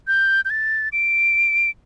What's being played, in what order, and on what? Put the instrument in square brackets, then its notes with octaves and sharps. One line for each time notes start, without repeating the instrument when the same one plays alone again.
[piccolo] G6
G6
A6
D7